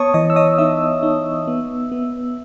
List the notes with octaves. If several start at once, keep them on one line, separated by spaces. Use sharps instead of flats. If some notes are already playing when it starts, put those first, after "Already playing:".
Already playing: B3 C#5 A5 C#6 D#6
E3 D#5 D#6
E6
D#5 D#6
D#4 E5 E6
D#4
B3
B3